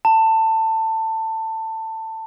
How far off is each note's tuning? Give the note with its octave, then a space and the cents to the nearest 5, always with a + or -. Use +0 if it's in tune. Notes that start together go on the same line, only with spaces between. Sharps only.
A5 +20